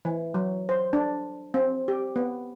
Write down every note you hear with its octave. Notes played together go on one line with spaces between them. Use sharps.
E3
F#3
C5
D4
C4
G4
B3